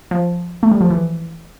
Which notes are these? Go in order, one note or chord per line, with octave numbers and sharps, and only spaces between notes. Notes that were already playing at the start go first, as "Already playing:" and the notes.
F3
A3
G3
F3
E3